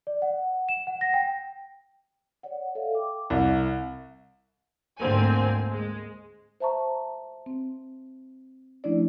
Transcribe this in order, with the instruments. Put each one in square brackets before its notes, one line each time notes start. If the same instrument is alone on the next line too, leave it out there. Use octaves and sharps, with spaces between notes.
[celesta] D5
F#5
E7
F#5
A#6
G5
[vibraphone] C#5 D5 F#5
A4 E5 F5
G5 D6
[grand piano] C2 [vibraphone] E5
[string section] D2 G#2 D3 A#3 C4 G#5
G#3
[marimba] C5 E5 A5 A#5 C#6
C4
F3 A3 C#4 D4 E4 D5